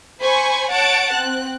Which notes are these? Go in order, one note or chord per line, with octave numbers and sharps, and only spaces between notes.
C5 G#5 B5 C#6
C#5 F#5 A5 D7
C4 F#6